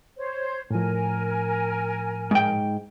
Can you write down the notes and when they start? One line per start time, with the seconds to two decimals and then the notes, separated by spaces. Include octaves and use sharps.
0.17 C5 C#5
0.70 A2 F3 A#4 G#5
2.31 G#2 G5